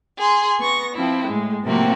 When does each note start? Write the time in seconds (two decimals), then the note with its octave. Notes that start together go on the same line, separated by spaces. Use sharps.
0.17 G#4 C6
0.59 B3 C#6 A#6
0.94 F3 C4 E4
1.26 A2 G#3
1.63 A2 C3 F3 A#3 C4 F#4